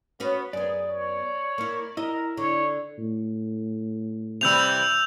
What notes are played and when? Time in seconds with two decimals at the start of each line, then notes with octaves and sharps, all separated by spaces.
0.20 B3 C#4 F#4 B4
0.53 F#2 B3 G#4 D5
0.88 C#5
1.58 A#3 E4
1.97 E4 A#4 D#5
2.37 D3 C#5
2.98 A2
4.41 C3 E3 G3 E6 G6 F7